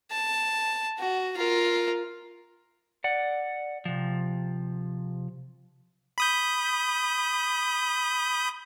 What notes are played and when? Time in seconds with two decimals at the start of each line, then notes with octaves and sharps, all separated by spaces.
0.12 A5
0.99 F#4
1.37 F4 A#4
3.04 D5 F#5
3.85 C3 F3
6.18 B5 D#6 G6